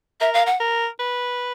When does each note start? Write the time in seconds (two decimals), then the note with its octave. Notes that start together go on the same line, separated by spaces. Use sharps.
0.20 A#4 E5
0.34 F5
0.46 F#5
0.60 A#4
0.99 B4